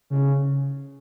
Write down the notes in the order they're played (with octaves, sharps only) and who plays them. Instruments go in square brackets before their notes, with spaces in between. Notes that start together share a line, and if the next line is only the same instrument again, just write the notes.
[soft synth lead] C#3